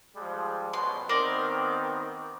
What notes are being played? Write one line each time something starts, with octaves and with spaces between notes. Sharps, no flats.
F3 G3 G#3
A1 B2 C6
D#3 B3 C4 A#4 D5 C6